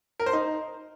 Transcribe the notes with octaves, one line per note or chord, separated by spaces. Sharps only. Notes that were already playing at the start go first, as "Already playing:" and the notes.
A#4
C5
D#4